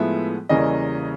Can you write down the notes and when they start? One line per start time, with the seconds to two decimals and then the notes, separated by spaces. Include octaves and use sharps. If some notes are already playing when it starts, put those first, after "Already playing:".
Already playing: A2 F3 G#3 B3 E5
0.49 E2 C#3 E3 G3 A#3 D#5